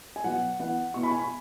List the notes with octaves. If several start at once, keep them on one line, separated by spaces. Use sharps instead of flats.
G#5
B2 F#3 B3 F#5
E3 B3 E4 F#5
B2 B3 E4 C#6
B5
G#5
B5